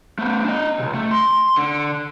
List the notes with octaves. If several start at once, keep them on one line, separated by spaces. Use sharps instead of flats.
A3 B3
D4 D#5
C#2 C3
A3
C6
D3